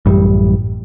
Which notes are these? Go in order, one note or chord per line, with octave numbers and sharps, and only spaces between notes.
A1 F#2 G3